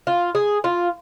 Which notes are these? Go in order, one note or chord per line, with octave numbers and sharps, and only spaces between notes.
F4
G#4
F4